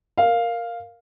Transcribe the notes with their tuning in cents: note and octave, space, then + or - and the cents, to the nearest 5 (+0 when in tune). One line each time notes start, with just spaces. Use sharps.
A#4 +0 F5 +0